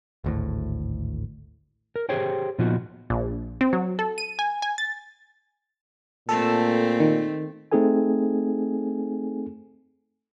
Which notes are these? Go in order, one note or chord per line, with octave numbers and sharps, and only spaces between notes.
G#1 D2 A2
A#4
G4 G#4 C5 C#5 G5
A#2 F3 B3 D#4 F4 F#4
A#1
C4
F#3
A4
D#7
G#5
G#5
A6
A#2 A3 C4 A4
D#3
A3 C4 D#4 G#4 A4 G#5